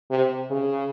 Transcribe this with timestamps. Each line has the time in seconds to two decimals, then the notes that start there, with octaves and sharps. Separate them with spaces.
0.11 C3
0.51 C#3